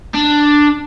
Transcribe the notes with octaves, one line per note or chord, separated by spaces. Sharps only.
D4